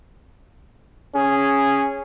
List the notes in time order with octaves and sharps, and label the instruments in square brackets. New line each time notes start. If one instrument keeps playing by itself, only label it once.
[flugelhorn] C#4 [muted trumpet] G#4